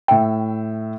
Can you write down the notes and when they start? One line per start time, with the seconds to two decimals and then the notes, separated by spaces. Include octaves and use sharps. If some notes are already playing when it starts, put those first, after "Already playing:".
0.08 A2 E5 G5